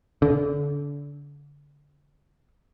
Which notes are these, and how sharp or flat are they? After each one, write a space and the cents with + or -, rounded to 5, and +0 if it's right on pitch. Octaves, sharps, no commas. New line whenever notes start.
D3 -30